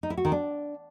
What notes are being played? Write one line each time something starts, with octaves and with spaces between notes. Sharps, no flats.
D#4
E4
F#4
D#3
D4